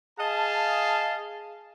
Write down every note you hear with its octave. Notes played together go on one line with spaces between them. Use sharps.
G#4 D#5 F5 A5